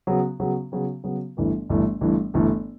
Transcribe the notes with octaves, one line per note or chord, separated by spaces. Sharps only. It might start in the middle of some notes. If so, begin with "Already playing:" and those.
C#3 F#3 B3
C#3 F#3 B3
C#3 F#3 B3
C#3 F#3 B3
G1 G2 E3 A3
G1 G2 E3 A3
G1 G2 E3 A3
G1 G2 E3 A3